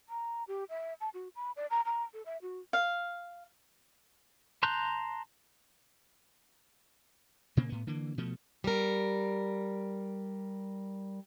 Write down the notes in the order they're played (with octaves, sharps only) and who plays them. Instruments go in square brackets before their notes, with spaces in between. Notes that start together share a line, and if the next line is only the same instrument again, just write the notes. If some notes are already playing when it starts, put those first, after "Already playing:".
[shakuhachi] A#5
G4
E5
A5
F#4
B5
D5
A#5
A#5
A4
E5
F#4
[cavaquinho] F5
[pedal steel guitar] A5 A#5 C6 F#6 G6
[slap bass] A#2 C#3 A#3 C4
A2 B3
D3 E3 A#3
B2 F3 A3
[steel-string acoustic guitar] G3 A#4